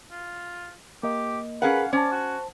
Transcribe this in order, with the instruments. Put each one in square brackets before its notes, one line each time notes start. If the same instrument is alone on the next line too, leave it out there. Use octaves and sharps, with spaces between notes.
[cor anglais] F4
[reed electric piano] A#3 D#5 [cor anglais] G4
[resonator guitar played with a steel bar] C#4 F5 F#5 [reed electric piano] G#4 A#4 [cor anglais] B4
[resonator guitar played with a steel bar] C#4 [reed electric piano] C5 A5 [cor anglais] D5
[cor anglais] F#4